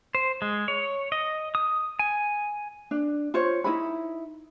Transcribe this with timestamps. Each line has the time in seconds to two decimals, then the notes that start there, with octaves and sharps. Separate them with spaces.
0.15 C5
0.42 G#3
0.68 C#5
1.12 D#5
1.55 D#6
1.99 G#5
2.91 D4
3.34 F4 C5 C#5
3.64 D#4 E4 A#4 B5